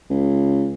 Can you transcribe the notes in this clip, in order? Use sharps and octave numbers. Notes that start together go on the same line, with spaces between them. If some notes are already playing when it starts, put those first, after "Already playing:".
C#2